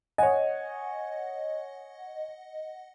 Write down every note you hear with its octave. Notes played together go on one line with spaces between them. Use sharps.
C#5 D#5 F#5 G#5